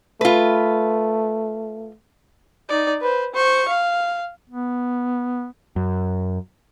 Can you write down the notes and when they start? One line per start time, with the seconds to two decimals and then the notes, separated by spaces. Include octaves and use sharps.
0.21 A3 F4 B4
2.69 D#4 D5
3.01 B4 C5
3.34 C5 C#6
3.68 F5
4.50 B3
5.76 F#2